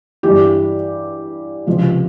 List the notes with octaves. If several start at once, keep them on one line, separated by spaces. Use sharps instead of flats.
G2 E3 G4
C#2 C3 F3